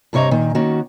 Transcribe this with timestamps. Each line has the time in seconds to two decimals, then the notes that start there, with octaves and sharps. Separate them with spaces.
0.13 G2 C3 G3 C#5 D#5 A#5
0.31 A#2 D#3
0.55 D#3 A#3 C#4 F#4